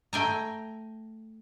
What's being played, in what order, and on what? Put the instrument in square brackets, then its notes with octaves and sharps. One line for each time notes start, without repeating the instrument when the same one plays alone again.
[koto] A3 G5 G#5 A#5